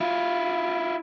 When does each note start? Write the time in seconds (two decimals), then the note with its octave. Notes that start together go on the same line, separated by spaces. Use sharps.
0.01 E4 F4